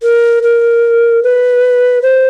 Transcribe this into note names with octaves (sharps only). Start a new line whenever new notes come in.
A#4
A#4
B4
C5